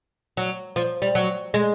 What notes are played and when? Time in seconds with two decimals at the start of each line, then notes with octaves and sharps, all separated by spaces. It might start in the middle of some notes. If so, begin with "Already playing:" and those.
0.37 F#3
0.76 F3
1.02 G3
1.15 F#3
1.54 G#3